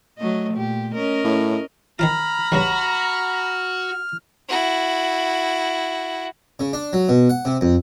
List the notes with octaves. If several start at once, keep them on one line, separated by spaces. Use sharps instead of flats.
F#3 A3 D#5
A#2 G4
C#4 A#4 D#5
A2
D#3 C4 F4 A#5 B5 F6
A1 G2 C#3 F#4
E4 F#4
C#3
D4
F#3
B2
F#5
C3
F2